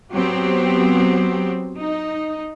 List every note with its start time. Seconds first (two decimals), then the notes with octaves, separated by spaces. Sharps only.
0.13 F#3 B3 C4 G4
1.78 D#4